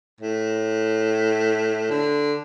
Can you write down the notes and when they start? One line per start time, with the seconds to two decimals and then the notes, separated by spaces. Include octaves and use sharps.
0.21 A2
1.90 D3